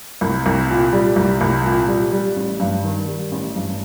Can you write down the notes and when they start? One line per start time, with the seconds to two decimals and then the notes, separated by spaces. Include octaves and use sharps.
0.21 C2
0.46 C2
0.70 A#2
0.93 G3
1.16 C2
1.41 C2
1.64 A#2
1.88 G3
2.12 G3
2.36 A1
2.60 G2
2.83 D#3
3.07 G3
3.31 A1
3.55 G2